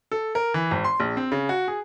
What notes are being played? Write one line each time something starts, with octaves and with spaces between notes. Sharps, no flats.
A4
A#4
E3
G#1
C6
A#1
C4
C#3
F#4
G#4